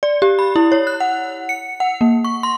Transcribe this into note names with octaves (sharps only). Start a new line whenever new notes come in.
D5
G4
B5
E4
C#5
F#6
F#5
C#7
F#5
A#3
C#6
C6